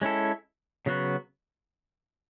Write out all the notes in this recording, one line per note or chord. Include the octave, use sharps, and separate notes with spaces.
G#3 C#4 E4 A4
C#3 F#3 B3 F#4